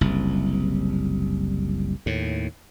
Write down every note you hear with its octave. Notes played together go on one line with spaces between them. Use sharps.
F#1 C2
D#2 A2